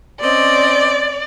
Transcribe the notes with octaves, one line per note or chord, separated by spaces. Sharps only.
C4 C#4 D5 D#5